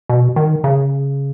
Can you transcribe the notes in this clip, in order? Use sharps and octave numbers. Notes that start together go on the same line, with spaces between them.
B2
D#3
C#3